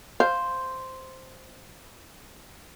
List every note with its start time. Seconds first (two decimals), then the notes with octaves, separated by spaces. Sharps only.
0.20 C5 F5